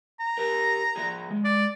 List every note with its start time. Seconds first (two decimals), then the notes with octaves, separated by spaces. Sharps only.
0.20 A#5
0.38 G4 A#4
0.96 F3 G#4
1.31 G#3
1.45 D5